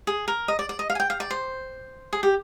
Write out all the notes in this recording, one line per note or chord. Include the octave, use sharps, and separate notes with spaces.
G#4
A#4
D#5
D5
D5
D#5
F5
G#5
G5
F5
D5
C5
G#4
G4